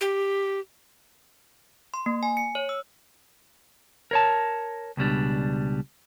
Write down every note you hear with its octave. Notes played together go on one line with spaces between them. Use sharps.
G4
C6
A#3
G#5
C#7
C#5
E6
A#4 C#5 A5
C#2 B2 G3 D4